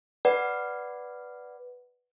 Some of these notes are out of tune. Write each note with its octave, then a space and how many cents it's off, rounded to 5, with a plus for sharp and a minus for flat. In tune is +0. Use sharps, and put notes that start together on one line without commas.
B4 +0 D5 +0 F#5 +5